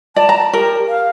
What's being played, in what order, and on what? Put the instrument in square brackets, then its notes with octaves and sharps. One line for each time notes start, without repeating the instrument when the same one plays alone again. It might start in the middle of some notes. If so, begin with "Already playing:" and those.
[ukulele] D5 [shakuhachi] A5
[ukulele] A#5
[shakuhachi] G4 [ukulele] A#4
[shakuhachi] F5